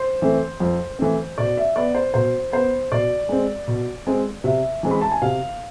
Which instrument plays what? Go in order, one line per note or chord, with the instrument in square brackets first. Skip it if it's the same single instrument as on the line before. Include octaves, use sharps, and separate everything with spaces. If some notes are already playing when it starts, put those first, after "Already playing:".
Already playing: [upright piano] C5
E3 A3 C4
F2
E3 A3 C4
B2 D5
E5
B3 D5
C5
B2 C5
B3 C5
B2 D5
G#3 C4
B2
G#3 C4
C3 E5
E3 G#3 C4
B5
A5
G#5
C3 F5